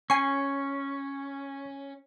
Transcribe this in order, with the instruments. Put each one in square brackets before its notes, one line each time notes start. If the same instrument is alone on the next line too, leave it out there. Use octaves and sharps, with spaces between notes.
[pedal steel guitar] C#4 [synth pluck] G#5 C7 [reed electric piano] C#6